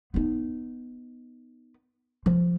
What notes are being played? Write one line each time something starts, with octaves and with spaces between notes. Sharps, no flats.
B3 D#4
F3